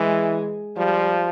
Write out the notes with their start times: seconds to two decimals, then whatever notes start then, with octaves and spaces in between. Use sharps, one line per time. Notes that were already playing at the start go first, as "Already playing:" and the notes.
Already playing: E3 G#3
0.77 F3 G3